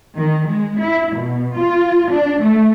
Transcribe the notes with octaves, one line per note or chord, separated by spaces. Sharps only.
D#3
G#3
E4
B2
F4
D4
A3